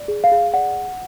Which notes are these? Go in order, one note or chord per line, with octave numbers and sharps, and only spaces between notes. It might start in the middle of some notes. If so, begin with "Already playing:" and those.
Already playing: D5
G#4
F5
G#4
D5 F#5